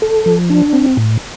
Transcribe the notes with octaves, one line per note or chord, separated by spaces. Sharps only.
A4
F3
D4
C4
A2